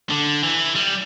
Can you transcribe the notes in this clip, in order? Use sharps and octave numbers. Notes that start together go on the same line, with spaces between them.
D3
E3
G3